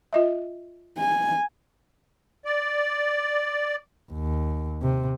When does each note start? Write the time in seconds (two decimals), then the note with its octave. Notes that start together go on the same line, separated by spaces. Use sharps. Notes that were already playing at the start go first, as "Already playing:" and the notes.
0.13 F4 D#5 E5
0.98 G#5
2.45 D5
4.12 D#2
4.82 C3